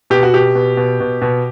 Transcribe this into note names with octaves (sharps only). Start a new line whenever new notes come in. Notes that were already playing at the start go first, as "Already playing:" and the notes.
B2 G4
F#4
B2 G4
B2
B2
B2
B2